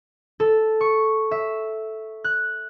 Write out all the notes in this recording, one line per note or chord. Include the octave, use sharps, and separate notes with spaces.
A4
C#6
E5
F#6